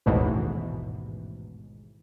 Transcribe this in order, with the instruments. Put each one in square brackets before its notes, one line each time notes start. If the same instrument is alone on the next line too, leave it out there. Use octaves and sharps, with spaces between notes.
[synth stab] A1 D#2 G#2 B2 E3